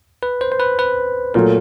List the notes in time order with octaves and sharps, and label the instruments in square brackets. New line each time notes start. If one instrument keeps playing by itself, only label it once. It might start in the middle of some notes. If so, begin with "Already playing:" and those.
[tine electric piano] B4
C5
C5
B4
B4
[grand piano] A#2 F#3 A3 [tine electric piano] A#4